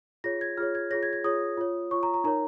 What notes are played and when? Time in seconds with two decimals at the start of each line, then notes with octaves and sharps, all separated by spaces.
0.24 F4 G#4 C#5 A#6
0.41 G#6
0.57 F4 G#4 C#5 F6
0.75 G#6
0.90 F4 G#4 C#5 A#6
1.03 G#6
1.13 G#6
1.24 F4 G#4 C#5 D#6
1.57 F4 C#5
1.91 F4 C#5 C#6
2.03 A#5
2.14 A#5
2.24 D#4 A#4 C#5 A#5